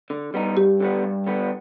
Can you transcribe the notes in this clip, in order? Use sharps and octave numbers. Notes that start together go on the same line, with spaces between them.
D3
G3 B3 D#4
G2 G4
D3 G3 B3
G2
D3 G3 B3